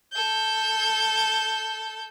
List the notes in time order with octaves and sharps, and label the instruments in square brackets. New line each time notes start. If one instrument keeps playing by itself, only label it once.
[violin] A4 G6